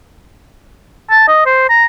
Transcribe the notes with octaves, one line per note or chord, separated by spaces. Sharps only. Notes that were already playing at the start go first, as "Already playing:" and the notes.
A5
D#5
C5
A#5